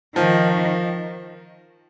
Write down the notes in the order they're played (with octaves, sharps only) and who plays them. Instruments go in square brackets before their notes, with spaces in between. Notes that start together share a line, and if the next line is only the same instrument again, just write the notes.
[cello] D#3 [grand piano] F3